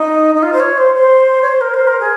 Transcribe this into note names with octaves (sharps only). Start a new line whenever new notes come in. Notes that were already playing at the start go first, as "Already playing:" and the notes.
Already playing: D#4
D#4
F4
C5
C#5
C5
C5
C#5
C5
A#4
C5
A#4
G#4